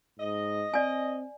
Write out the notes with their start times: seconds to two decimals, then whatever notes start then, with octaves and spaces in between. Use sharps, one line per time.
0.20 G#2 D#5
0.74 C4 D5 G#5